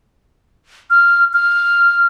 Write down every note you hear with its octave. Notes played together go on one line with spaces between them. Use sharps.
F6
F6